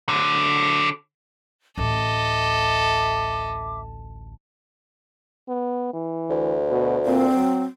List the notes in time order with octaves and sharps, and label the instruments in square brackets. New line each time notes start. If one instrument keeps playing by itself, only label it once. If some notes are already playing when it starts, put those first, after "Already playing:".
[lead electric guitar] D3 F#3
[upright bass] A1 D2 [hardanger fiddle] A4 D#5 [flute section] E5 D6
[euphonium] B3
E3
[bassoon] D2
[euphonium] B2
[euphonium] A#2 [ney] C4
[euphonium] F#3